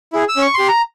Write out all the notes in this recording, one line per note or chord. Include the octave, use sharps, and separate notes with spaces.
E4 G#4
E6
C#4
C#6
G4 C6
A#5